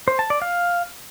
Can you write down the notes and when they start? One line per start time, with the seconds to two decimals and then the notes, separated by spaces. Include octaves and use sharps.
0.08 C5
0.19 A5
0.30 D5
0.42 F5